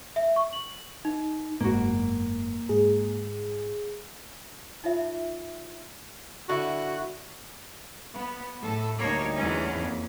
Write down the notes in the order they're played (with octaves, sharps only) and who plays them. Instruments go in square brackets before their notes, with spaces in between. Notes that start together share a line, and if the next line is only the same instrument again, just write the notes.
[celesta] E5
C#6
F#7
D#4
[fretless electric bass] F#1 G#2 [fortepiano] B2 F#4 [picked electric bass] A#3
[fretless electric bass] G#2 [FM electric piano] G#4
[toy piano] D#4 F4 C#5 E5
[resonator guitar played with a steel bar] D3 E4 [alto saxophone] F#4
[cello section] B3
A2 A4
[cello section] D2 G3 D#4 [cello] A#3 C#5
[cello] E2 C#4
[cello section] F2 A#3